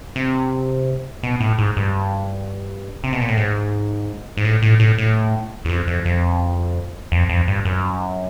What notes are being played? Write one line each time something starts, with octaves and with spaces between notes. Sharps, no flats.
C3
B2
A2
G#2
G2
C3
B2
A#2
A2
G#2
G#2
A2
A2
A2
A2
E2
F2
F2
F2
F2
F2
G2
F#2